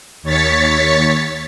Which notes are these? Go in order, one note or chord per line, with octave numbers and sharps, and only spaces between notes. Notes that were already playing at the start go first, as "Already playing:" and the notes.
D#2 C#5 A6 B6 C#7